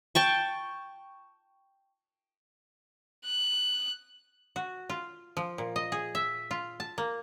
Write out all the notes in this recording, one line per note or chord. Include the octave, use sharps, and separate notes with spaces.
G5 A5 C#6
F#6
F#4
F4
F3
A#2
D#5
G#4
E5
F4
A5
A#3